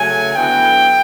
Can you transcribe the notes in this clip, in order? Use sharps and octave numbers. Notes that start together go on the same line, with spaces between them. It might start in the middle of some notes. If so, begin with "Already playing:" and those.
Already playing: C#3 F#3 A3 C#4 G#5
D3 F#3 B3 E4 G5